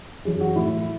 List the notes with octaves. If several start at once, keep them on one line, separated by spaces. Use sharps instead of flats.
F#2 E3 G#4
F#4
A2 E3 E4